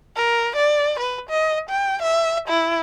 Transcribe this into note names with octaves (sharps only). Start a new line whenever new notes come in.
A#4
D5
B4
D#5
G5
E5
E4